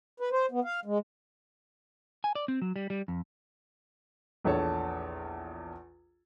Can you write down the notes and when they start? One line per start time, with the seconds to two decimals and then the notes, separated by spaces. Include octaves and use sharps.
0.20 B4
0.32 C5
0.51 B3
0.64 F5
0.85 G#3
2.24 G#5
2.35 D5
2.48 C4
2.62 F#3
2.76 G3
2.90 G3
3.08 F2
4.44 A#1 E2 A4 C#5 A5